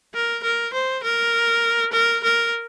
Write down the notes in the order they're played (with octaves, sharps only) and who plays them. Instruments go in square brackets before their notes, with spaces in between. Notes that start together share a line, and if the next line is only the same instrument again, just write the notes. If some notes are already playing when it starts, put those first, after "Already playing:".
[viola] A#4
A#4
C5
A#4
A#4
A#4